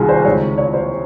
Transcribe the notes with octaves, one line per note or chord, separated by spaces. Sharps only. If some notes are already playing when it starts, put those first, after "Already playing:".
Already playing: C2 C3 D#3 F4 F#4 G#4
C5
C#2 C3 D#3 C#5
C#5
C5